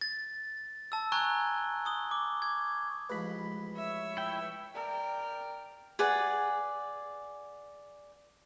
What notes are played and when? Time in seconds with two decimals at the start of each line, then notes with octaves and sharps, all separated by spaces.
0.01 A6
0.92 A5 E6
1.12 G#5 A#5 C#6 F#6 G#6 G7
1.85 C#6 D#6 G7
2.11 D6
2.42 G#6
3.09 A1 F3 G#3 B4 B5
3.76 C#5 E5
4.17 E4 G5
4.74 A#4 D5 G5
5.99 G#4 B4 D5 F#5